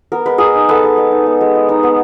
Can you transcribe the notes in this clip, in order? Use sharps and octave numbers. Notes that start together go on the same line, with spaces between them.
B3 A#4
G#3 B4
G#3 G#4 A#4
D#4
B3 A4 B4
G#3
G#3
D#4
B3
G#3
G#3
D#4
B3